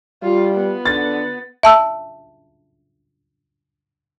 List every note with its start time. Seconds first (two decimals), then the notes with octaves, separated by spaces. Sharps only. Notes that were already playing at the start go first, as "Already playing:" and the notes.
0.23 G3 F4
0.55 B3
0.85 D3 A6
1.63 E5 A5 E6